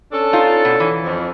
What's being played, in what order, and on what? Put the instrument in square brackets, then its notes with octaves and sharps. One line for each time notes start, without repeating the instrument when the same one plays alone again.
[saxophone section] C#4 D4 A4
[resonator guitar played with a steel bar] D#4 F4
B2
E3
[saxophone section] F2